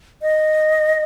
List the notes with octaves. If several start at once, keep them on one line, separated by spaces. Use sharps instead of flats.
D#5